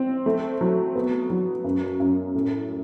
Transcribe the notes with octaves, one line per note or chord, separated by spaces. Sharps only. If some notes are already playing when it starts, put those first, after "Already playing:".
Already playing: C4
A3
F#3
B3
F#3
F#2
F#2
A2